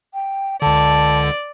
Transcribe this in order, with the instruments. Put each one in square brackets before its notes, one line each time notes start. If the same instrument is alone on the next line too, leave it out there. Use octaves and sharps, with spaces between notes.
[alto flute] G5
[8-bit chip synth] C#2 D3 [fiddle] D5 [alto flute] A5